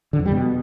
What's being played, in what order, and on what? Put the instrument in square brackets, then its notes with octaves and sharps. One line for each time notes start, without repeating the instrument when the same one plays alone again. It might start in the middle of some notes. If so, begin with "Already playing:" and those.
[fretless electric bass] D3
F2
G3
B2